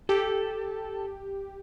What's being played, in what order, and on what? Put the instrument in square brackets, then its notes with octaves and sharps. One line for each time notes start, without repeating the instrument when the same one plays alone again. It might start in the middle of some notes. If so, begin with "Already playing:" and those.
[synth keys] G4 [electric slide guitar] A4